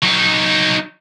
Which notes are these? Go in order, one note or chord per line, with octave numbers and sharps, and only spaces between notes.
F#3 D#4